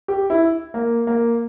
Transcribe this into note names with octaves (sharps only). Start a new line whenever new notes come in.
G4
E4
A#3
A#3